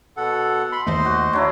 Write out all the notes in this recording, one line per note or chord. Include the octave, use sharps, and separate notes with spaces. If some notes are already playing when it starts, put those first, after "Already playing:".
B2 A4 F#5
B5 C6
D#2 A3 C5 D#5 C6
F#4
F#3 D4 E4